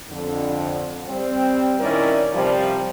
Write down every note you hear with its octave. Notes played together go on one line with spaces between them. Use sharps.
F2 D3
G3 C4
A#2 D#3 C#4 E4 A#4 D5
C3 F3 G3